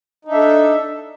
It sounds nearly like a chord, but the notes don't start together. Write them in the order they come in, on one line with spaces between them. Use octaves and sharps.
D#4 D4 E5 A4